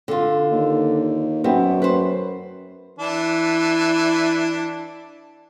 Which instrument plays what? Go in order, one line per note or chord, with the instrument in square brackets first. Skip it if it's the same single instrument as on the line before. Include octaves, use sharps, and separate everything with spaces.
[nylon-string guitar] D3 F4
[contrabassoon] D#2
[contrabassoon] F#2 [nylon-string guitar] B3 C4
[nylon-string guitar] B4 C5
[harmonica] E3 D4